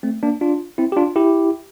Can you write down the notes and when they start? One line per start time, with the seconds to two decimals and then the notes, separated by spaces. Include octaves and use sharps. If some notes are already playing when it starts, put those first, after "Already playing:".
0.03 A3 C4
0.23 A#3 D4
0.41 D4 F4
0.78 C4 E4
0.92 G4
0.97 D4 F4
1.16 E4 G4